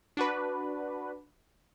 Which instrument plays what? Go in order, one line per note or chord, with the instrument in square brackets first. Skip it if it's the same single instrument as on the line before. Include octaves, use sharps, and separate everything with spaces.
[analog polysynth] D4 F#4 B4